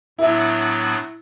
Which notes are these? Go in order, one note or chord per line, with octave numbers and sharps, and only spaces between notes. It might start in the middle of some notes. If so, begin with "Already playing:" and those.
A2 F#3 B3 D4 E4